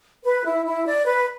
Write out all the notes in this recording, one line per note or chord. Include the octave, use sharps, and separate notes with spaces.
B4
E4
E4
D5
B4